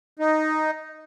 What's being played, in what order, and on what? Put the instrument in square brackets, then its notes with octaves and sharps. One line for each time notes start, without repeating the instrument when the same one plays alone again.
[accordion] D#4